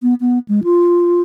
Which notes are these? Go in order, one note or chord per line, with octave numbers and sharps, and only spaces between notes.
B3
B3
G#3
F4